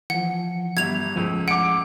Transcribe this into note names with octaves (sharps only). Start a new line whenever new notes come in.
E3 F3 F#5
G1 G3 E5 G#6 F7
C#2 A2 F3 D#7
F#5 D6 D7